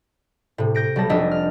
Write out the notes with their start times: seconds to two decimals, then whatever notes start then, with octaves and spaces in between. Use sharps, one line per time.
0.58 A2 C3
0.75 G6 A#6 D7
0.96 B1 G3 A5 A#6
1.09 F1 F3 D4 D#5 E5
1.31 F6